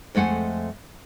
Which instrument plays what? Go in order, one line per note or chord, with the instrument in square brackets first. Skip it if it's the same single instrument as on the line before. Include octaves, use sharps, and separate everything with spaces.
[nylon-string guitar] F2 G#3 A3 F#5 G#5